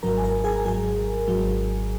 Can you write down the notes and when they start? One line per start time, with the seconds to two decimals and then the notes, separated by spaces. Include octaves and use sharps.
0.03 G#1 G#2 F#3 A#4 A#5
0.18 G#5
0.24 A#4 A#5
0.44 G#4 G#5
0.56 A#5
0.65 G#1 G#2 F#3 G#4 G#5
1.28 G#1 G#2 F#3